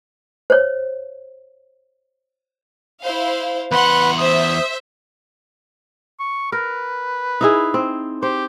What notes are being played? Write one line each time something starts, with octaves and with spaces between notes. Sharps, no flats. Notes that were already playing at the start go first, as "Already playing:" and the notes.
C5 C#5
E4 C5 F5
E2 B4 F#5 C6 F#6
C5 E5 D#6
C#6
A#4 B4
D#4 E4 G#4
C4
G4 C5